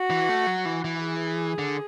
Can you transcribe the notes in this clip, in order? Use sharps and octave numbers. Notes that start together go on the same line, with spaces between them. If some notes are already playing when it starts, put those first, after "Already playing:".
Already playing: F#4
E3
A3
F#3
E3
E3
G#4
D3